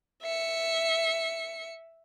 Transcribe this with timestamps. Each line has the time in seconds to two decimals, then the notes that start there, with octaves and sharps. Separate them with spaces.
0.22 E5 C#7